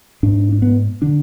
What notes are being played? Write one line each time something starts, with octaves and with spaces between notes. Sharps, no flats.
G#2 D4
D4
B3
D3 D4